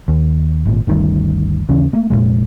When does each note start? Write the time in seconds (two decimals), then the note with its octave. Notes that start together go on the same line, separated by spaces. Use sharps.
0.08 D#2
0.66 G#1 A#2
0.87 G1 D2 D#3 G3
1.69 D#2 C#3 E3 C#4
1.93 A3 A#3
2.10 F1 C#2 A#2 G#3